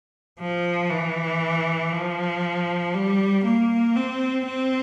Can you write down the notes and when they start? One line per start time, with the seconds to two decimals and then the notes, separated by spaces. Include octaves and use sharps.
0.40 F3
0.91 E3
1.93 F3
2.95 G3
3.45 A#3
3.96 C4
4.46 C4